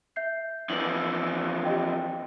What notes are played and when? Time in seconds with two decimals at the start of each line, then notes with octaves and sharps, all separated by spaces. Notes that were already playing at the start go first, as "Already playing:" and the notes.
0.16 E5 G6 C7
0.70 F2 E3 F#7
1.65 G4 D#5 G5